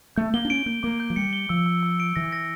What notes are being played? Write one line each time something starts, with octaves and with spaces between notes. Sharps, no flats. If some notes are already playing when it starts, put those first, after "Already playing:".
A3 G6
A#3 G7
D4
C#4 D7
A#3 G6
A#3 D6
G6
F3
G3 C#7
G7
F3 E6
E6
E6
D7
E3 A#6
A#6